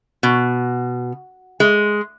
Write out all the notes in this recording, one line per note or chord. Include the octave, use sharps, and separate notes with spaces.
B2
G#3